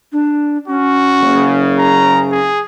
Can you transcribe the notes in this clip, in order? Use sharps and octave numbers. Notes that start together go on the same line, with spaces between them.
D4
C#4 F#4
F#1 C#3
A#5
G#4